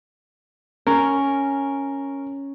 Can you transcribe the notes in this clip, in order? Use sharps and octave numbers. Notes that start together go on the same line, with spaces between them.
C#4 A#4